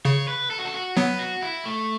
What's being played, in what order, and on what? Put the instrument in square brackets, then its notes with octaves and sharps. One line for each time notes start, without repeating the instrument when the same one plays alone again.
[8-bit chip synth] C#3 [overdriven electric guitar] C#5
[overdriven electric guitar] B4
A4
F#4
A4
F#4
[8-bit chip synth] F#3 B3 [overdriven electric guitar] B4
[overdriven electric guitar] F#4
E4
A3